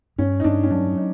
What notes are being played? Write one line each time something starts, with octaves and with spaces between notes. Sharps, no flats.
G2 C#4
D#4
G2 D4
C#4
F#3 D4
D#4